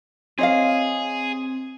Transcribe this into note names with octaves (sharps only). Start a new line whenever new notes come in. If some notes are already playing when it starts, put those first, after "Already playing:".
C4 G#4 C#5 D#5 F5